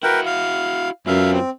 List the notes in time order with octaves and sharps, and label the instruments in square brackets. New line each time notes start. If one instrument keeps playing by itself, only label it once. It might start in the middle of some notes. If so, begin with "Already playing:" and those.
[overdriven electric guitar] E4 F#4 [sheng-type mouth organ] A#4 B4 G5
[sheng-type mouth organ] F5
[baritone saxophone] F#2 [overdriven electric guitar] F4 B4 [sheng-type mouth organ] E5 F5
[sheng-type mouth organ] C4